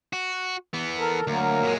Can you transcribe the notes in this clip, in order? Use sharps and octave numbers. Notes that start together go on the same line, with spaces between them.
F#4
E3 B3
A4 A#4
D2 F#3 A#3 A#4
A#2 G#3